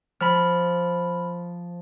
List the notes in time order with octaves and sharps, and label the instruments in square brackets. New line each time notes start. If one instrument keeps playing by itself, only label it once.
[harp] F3 [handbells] B5 F6